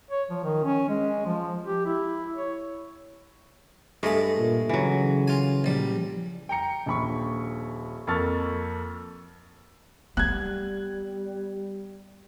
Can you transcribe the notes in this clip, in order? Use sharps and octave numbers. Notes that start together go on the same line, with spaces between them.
C#5
F3
D#3
C#4
G#3
F3
G4
E4
C#5
G2 G#3 A3 G#4
A#2
C#3 E3 F#3
F4 G#5
A#1 G3
G5 A#5 C#7
D#1 A#1 B5 C#6
F2 A#3 A4 C#6 F6 A6
G3 B3 F#6 G#6